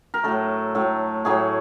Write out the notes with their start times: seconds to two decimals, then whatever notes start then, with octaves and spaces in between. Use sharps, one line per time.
0.14 A#4
0.24 A2 F#3 A3 A4
0.75 A2 F#3 A3
1.25 A2 F#3 A3 G#4